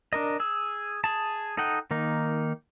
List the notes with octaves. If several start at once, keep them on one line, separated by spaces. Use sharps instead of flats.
D4 A#4 D#5
G#4 E6
G#4 A5
D#4 A4 D#5 F#5 G5
D#3 A#3 D#4